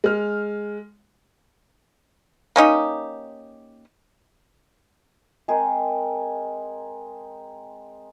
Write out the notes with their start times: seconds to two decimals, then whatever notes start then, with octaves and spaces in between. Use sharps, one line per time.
0.04 G#3 F6
2.56 A#3 C#4 D#4 G4
5.48 G#3 C4 G#4 A#4